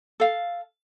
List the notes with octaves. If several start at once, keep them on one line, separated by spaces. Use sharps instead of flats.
A4 F5